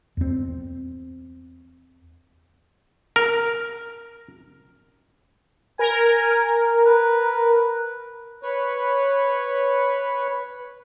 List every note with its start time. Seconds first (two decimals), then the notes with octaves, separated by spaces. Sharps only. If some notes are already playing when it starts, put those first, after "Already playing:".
0.17 E2 C4
3.16 A#4
5.79 A#4 G#5
6.85 B4
8.43 B4 C#5